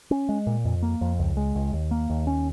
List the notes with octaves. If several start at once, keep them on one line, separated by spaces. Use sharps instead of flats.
C#4
G#3
A#2
F2
A#3
F2
C#2
G#3
C#2
D#2
A#3
D#2
C#4